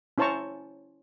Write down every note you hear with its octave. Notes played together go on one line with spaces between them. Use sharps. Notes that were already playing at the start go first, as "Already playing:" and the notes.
C#4 E4 C5 A5 A#5 C#6